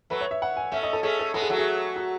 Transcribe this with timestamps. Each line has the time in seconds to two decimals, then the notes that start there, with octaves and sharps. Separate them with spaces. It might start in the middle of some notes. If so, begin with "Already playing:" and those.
0.10 F#3 A3 B4
0.21 C#5
0.31 E5
0.42 F#5
0.57 G#5
0.72 A3 C#4 E5
0.83 D#5
0.93 A4
1.03 A3 C#4 G#4
1.19 A4
1.34 G#3 B3 A4
1.42 G#4
1.50 F#3 A3 F#4
1.58 G#4
1.96 F#4